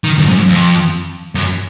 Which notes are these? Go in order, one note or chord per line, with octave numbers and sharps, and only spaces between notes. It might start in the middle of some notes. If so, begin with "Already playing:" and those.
D#3
F#2
G#2
F#2
F2
F#2